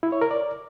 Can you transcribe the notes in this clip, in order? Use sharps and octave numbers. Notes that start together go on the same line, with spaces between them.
E4
C#5
A#4
D5